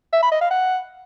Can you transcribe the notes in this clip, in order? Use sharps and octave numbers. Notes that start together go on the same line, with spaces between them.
E5
B5
D#5
F5
F#5